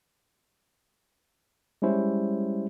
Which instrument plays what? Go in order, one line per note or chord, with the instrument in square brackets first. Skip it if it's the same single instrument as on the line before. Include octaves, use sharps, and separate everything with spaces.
[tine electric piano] G3 G#3 C#4 E4 C5